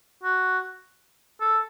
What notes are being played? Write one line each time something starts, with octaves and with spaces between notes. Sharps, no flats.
F#4
A4